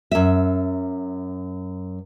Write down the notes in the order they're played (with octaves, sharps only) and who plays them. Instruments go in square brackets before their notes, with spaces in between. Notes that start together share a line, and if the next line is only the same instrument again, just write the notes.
[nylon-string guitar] F#2 E5